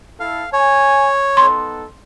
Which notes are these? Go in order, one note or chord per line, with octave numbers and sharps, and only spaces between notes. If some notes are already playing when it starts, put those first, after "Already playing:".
E4 A4 F5
C#5 G#5
B3 D#4 A4 C6